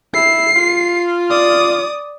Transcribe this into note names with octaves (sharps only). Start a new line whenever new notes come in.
E4 C7
F4
D5 D#6